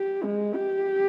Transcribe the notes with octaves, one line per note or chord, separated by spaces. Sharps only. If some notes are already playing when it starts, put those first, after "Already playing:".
Already playing: G4
G#3
G4